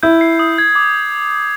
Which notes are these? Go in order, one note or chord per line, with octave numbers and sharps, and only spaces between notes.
E4 G6
C7
D#6
G#6
D6